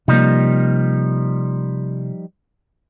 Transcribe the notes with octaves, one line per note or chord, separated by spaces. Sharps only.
C3 F3 G3 A#3 D#4